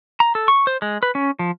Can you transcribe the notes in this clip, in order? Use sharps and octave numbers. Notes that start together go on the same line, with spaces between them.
A#5
A4
C#6
C5
G#3
B4
C#4
F3